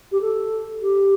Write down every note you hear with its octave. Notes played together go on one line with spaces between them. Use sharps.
G4
A4
G4